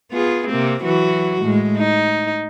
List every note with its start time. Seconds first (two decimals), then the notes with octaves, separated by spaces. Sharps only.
0.11 B3 F4 G#4
0.48 C3 A#3 C4
0.84 E3 F#3 F#4
1.42 A2 G#3
1.77 D#4